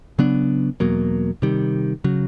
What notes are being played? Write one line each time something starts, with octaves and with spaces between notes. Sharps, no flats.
C#3 F#3 B3 D4
E2 B2 F#3 A#3
C3 D#3 G3
C#3 F#3